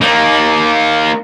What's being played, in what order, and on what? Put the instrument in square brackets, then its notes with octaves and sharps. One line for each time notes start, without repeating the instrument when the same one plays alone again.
[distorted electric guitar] A#3 D#4